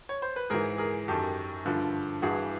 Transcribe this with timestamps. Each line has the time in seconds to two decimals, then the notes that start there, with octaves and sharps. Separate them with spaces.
0.09 C#5
0.22 C5
0.36 B4
0.50 G#2 E3 G#4 A#4
0.78 G#4 A#4
1.08 F#2 D#3 G4 A4
1.65 G2 D3 F3
2.22 G2 E3 F#4 G#4